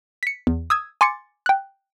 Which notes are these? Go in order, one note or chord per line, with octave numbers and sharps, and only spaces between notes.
B6 C#7
E2
D#6 E6 G#6
G#5 C6 D6 A6 C#7
G5 F#6